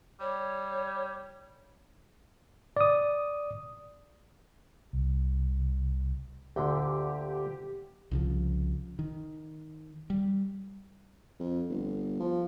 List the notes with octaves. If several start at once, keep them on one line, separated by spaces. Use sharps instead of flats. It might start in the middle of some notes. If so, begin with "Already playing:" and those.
G3 C#5
D5 D#6
C2
D2 A#2 D3 G4
C2 C#3 F3
D#3
G3
F2
G1
F3